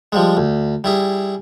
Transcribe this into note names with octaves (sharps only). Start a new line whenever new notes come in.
F3 G3 G#3
D2
G3 E4 G#4